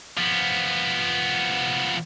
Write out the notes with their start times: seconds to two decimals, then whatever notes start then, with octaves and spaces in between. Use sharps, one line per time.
0.18 F3 B3